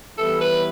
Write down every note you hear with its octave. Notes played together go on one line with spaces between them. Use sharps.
E3 G3 B3 E4 A4
B4